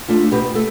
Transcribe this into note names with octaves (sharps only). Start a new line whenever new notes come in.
A3 D4 F4
B2 G4 B4
A3 A4